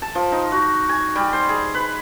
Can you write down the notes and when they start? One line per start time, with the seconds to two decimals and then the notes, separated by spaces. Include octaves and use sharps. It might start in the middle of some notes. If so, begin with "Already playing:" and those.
0.02 A5
0.15 F3
0.32 D#4
0.52 F#4
0.89 G#5
1.16 G3
1.33 C5
1.49 G#4
1.74 B4